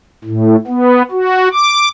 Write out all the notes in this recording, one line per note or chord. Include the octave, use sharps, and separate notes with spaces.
A2
B3
F#4
D6